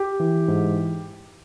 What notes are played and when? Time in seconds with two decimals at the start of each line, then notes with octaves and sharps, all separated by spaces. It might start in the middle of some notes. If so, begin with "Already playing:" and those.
Already playing: G4
0.20 E3
0.48 G#2